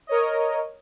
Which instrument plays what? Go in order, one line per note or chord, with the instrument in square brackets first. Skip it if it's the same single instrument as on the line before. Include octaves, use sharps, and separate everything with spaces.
[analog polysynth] A#4 C#5 D#5